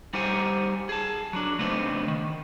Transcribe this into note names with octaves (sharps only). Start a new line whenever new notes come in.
G3 D#4 G4 C5 F#5 G#5
G#4 A5
F#3 D4
C#3 A3 B3 C4 D4 D#4
D#3